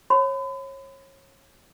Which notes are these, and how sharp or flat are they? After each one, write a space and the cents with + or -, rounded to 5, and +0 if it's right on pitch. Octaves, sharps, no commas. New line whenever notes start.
C#5 -30 B5 +40